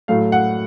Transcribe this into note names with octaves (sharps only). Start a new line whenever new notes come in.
A2 F#3 A3 F5
F#5